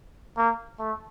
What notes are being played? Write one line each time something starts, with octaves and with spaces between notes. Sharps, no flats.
A#3
A3